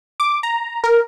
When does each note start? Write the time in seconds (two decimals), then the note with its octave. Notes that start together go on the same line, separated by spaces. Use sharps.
0.20 D6
0.43 A#5
0.84 A#4